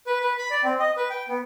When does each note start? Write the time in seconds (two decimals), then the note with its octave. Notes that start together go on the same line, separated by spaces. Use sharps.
0.07 B4
0.21 B4
0.38 B5
0.51 D5
0.64 C4
0.79 D#5
0.97 B4
1.10 G5
1.28 B3